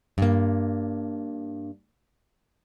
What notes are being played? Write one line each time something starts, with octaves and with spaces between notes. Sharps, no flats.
G2 A#3